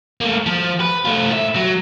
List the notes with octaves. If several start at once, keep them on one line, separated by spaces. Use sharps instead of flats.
A3 A#3
F3
B4
A3 F4
A2 E5
F#3